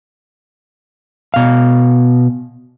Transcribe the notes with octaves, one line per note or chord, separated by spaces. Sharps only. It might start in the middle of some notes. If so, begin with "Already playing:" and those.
B2 F5